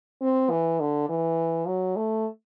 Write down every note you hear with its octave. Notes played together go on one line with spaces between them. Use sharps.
C4
E3
D3
E3
F#3
A3